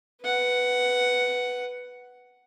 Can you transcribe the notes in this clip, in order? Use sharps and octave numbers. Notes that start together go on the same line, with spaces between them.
B4 F#5